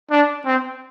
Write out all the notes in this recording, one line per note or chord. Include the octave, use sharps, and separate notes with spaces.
D4
C4